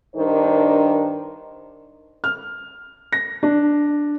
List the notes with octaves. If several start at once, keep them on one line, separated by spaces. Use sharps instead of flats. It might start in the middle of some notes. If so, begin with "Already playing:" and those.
G2 D#3 D4 A#4 C5
F6
A#6
D4